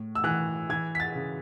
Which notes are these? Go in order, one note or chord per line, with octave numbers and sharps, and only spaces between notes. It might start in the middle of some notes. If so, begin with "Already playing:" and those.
Already playing: A2
E6
E3 F#6
E3 G#6
B6
A6
C#3